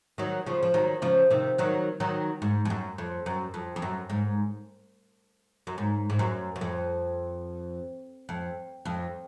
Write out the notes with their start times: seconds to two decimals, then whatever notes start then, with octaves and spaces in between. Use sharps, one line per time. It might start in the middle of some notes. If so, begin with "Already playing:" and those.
0.18 D#3 F#3
0.46 C#3 F3
0.63 F3
0.74 D#3 F#3
1.02 C#3 F3
1.30 C3 D#3
1.58 D#3 F#3
2.00 D#3 F#3
2.42 G#2
2.65 F2
2.70 F#2
2.98 F2
3.26 F#2
3.54 F2
3.76 F2
3.82 F#2
4.10 G#2
5.67 F#2
5.78 G#2
6.10 G#2
6.19 F#2
6.56 F#2
6.61 F2
8.29 F2
8.85 F2